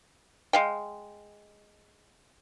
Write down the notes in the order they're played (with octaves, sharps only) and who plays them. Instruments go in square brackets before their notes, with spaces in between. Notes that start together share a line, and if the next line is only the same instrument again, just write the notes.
[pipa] G#3 F5 G5